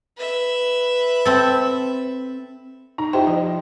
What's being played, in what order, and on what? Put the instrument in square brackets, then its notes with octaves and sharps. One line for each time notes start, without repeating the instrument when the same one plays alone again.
[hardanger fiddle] B4 E5
[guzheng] C4 A4
[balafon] D#4 [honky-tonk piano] A#5
[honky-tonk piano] E4 G4 C5 [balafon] F4 G5
[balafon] F3 [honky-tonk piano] D#5